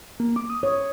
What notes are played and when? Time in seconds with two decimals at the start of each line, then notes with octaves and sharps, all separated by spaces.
0.20 A#3
0.36 D6
0.50 D#6
0.63 C#5